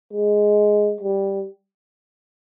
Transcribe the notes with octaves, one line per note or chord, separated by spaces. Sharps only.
G#3
G3